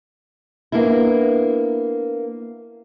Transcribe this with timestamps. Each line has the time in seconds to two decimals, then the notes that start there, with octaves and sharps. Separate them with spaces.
0.72 A#3 B3 D4 E4